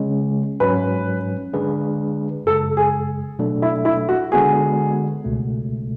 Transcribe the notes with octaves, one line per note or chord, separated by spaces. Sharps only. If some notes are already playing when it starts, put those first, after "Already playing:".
Already playing: C#3 G#3 C#4
G#2 F#3 C#4 B4
D3 G#3 D4 G#4 B4
F#2 C#3 G#3 A4
G#4
B2 F#3 A3 D4 A4
E4
E4
F#4
D3 G#3 B3 F#4 G#4
C#2 B2 A3